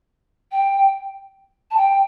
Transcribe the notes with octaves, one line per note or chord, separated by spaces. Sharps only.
G5
A5
G5